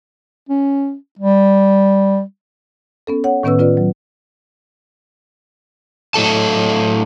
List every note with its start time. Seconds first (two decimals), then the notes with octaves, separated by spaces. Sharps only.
0.49 C#4
1.19 G3
3.07 B3 C#4 A4
3.24 C#5 F#5
3.43 A2 D#3 B3 C#4 B4 E6
3.59 C#4 F4 B4 D5
3.77 F#3
6.14 A2 F#3 A4 A5